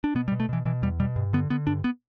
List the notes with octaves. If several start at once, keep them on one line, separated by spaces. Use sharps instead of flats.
D4
B2 B3
G3
B2
A3
B2 E3
B2 E3
E2 G3
B2 G3
G2
D3 B3
D3 B3
G2 D4
B3